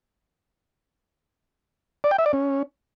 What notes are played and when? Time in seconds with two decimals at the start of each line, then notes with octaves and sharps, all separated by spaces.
2.04 D5
2.11 G5
2.19 E5
2.26 D5
2.33 C#4